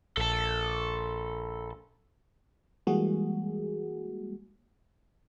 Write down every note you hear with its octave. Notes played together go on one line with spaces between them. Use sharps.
A#1 A4 A5
E3 G3 G#3 A#3 F#4 G#4